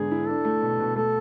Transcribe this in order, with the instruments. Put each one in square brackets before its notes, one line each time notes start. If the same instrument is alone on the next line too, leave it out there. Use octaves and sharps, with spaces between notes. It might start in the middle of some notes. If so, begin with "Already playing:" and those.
Already playing: [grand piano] G#2 D3 G#3 B3 [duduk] G#4
[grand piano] E4
[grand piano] D4 [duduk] A4
[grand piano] A3
B2
B2
[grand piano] A3 [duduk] A4